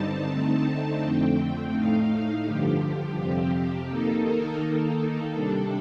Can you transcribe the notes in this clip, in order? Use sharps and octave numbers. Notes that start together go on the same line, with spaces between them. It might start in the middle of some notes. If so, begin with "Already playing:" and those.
Already playing: G2 D3 G3 C4 D#4 A5
D3 A3 C4 D#4
F2 D3 A3 C4 G5
A2 A3 D#4 F5
G2 D3 F3 G4
F2 C3 F3 C4
D#3 A#3 D#4 A4
A#4
D#3 A#3 D#4 A4
C3 G3 D4